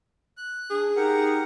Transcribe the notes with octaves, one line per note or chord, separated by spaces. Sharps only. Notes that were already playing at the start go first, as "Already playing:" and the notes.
F#6
D4 G#4
D#4 G4 A#4 F#5